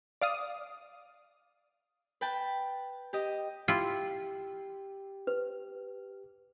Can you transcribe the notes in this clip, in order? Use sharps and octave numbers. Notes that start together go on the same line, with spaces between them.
D5 F5 D#6
B4 G5 A5
G4 D#5
E4 F4 G4
B4